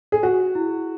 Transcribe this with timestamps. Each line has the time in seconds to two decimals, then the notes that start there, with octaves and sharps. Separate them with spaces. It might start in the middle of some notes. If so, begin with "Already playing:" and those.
0.12 G#4
0.23 F#4 G#4
0.55 E4